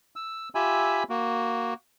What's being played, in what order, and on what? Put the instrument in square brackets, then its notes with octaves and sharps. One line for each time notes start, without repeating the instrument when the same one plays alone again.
[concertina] E6
F4 G4 E5 G#5 B5 E6
A#3 F#4